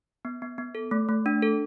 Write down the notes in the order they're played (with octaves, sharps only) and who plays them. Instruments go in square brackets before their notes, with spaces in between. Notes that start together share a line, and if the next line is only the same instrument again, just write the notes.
[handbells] B3
B3
B3
A4
A3
A3
D4
A4